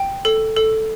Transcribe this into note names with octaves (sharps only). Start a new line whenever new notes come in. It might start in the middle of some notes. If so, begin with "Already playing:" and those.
Already playing: G5
A4
A4